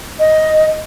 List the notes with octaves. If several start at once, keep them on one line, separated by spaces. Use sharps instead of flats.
D#5